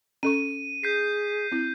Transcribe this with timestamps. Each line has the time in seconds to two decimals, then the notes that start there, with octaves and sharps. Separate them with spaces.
0.23 C#4 A4 C#6 D#7
0.83 G#4 G6 B6 C7
1.52 C4 E4